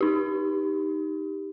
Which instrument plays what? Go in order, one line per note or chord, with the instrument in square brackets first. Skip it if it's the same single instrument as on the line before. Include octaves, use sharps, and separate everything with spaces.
[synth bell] D#4 G4